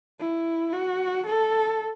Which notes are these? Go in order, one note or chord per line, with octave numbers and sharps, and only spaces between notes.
E4
F#4
A4